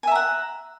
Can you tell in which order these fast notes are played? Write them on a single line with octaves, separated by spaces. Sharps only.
G#5 E5 A#5 F#5